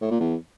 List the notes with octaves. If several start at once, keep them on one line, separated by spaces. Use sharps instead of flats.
A2
A#2
E2